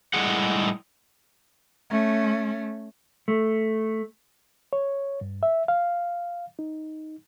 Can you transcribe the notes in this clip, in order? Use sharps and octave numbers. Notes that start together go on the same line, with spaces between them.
A2 G3 G#3 E4 G#4 F#5
A3 C#4
A3
C#5
G2
E5
F5
D#4